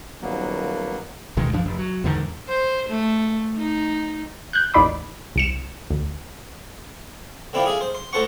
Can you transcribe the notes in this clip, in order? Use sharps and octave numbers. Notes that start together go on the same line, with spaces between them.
D#1 F#3 A#3 B3
C#2 B2 D#3 G#3
G2 F3 D4
F1
F#3
E2 G#2 D3 D#3
C5
A3
D#4
F#6 G6
A1 D#2 D#4 D5 B5 D6
C2 C#7 E7
D2
D3 C4 E4 F4 G4
G#4 E5 F5
C5
C6
A2 A4 C5 F#5 C#6